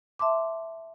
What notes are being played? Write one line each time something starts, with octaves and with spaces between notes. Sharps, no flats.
E5 A5 C6 D6